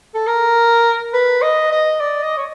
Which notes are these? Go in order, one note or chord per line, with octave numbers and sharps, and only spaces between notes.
A4
A#4
B4
D#5
D#5
D5
D#5
C#5